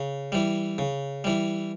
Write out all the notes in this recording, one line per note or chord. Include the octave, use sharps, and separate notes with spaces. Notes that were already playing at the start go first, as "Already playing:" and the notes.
Already playing: C#3
E3 G3
C#3
E3 G3